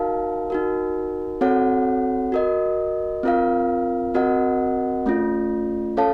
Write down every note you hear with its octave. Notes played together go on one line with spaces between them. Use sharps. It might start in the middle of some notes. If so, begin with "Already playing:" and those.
Already playing: D#4 F#4 A#4 F5 A5
D#4 F#4 A#4
C4 F#4 A4 C#5 F#5
F#4 A#4 D#5
C4 F4 A#4 F5
C4 F#4 A#4 D#5 F#5
A3 C#4 F4
C#4 A4 C#5 F5 A5